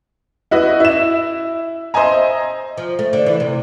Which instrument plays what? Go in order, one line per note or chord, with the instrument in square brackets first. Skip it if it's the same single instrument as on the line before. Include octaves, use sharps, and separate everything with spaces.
[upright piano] E4 F#4 B4 D#5
E4 E7
C5 D#5 E5 G#5 A#5
[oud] F3
A3
D3
E3
C3